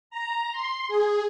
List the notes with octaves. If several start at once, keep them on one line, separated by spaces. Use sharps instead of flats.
A#5
C6
G#4